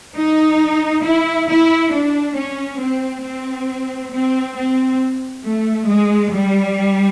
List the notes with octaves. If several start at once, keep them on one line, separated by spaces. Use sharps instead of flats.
D#4
E4
E4
D4
C#4
C4
C4
C4
C4
A3
G#3
G3